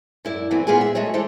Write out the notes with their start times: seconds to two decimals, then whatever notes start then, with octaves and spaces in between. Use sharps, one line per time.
0.25 F#2 E4 D5
0.51 E3 F#3 A3 B3 C4
0.67 A#2 B3 F4 G#4 D5 G#5
0.81 E5
0.95 G#3 A3 F#4 G#4 C#5
1.14 E3 D4 A4 C5 C#5